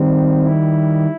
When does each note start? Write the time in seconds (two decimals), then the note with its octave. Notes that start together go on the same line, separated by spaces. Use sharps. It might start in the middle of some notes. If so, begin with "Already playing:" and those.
Already playing: D#3 G3 C4
0.42 E4